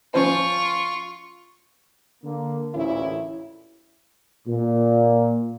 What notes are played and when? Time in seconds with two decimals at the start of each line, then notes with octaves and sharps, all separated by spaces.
0.14 F3 C#4 F4 C5 C#6
2.24 D3 A#3
2.74 A1 D2 A#2 C#4 E4
4.48 A#2